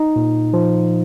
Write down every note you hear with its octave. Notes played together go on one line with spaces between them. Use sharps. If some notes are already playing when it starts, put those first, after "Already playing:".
Already playing: D#4
A#2
F3